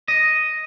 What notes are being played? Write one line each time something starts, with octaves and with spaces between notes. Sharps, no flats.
D#5